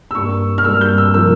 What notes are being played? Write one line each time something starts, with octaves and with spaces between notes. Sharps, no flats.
E6
G2 G3 A#3 C#6
F6
G2 G3 A#3 E6
G6
E6
C3 F3 A#3 E6